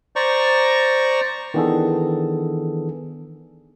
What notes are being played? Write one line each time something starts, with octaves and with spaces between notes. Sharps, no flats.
C5 D5 A#5 C#6
D#3 E3 B3 D4 G#4 A4